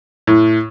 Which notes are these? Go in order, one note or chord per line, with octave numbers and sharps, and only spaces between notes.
A2